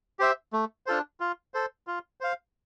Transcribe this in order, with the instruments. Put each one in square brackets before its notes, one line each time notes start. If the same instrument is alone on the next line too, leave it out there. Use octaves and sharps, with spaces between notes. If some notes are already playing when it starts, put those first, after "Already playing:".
[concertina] G4 C5 E5
A3
D4 F4 A4 C5
F4
A4 C5
F4
C5 F5